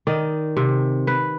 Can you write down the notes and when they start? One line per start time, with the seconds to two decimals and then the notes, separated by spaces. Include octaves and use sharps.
0.07 D#3 D5 D#5
0.57 C3
1.07 B4